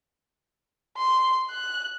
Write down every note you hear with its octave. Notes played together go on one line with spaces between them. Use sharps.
C6
F#6